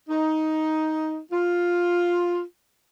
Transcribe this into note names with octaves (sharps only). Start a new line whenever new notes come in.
D#4
F4